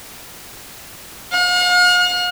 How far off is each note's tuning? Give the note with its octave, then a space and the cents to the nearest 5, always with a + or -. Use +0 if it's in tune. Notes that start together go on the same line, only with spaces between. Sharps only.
F5 +45